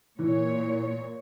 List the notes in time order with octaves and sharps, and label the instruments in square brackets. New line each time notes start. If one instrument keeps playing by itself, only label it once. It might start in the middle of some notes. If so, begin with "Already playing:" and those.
[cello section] A#2 C#5 [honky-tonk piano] E3